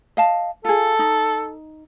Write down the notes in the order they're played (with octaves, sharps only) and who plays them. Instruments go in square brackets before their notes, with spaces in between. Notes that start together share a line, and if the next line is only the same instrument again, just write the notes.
[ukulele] D#5 F5 A5
[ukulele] F4 G#4 [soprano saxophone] A4
[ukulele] D#4